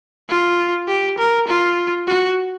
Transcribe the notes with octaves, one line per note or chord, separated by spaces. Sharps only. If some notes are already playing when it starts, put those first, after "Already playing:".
F4
G4
A#4
F4
F#4